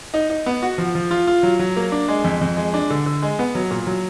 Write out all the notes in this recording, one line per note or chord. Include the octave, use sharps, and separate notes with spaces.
D#4
D#4
B3
F#4
F3
F3
F4
F4
F#3
F#3
A#3
D4
G#3
F2
F2
G#3
D4
D3
D3
G#3
B3
F#3
A#2
F#3